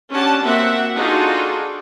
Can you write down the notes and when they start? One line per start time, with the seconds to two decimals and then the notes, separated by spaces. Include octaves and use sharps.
0.10 C#4 D4 G4 F#5 A5
0.43 A#3 C4 F#4 E5 F#5
0.95 D4 D#4 F4 F#4 G#4 A4